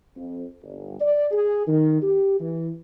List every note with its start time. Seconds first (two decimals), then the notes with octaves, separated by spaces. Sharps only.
0.16 F2
0.62 G1
1.00 D5
1.31 G#4
1.67 D#3
2.01 G4
2.39 E3